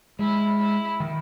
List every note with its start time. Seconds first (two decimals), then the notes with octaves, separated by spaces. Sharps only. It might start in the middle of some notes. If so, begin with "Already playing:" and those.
0.19 G#3 E4
0.59 E4
1.00 D#3